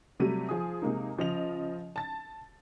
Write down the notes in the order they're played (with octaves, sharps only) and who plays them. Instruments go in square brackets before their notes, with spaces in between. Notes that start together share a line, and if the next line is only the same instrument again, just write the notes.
[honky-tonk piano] C3 F#3 G3 A3 D#7
F3 G#4 D#6
C3 G#3 A#3 D#4
C#3 F3 D#5 F7
A5 A6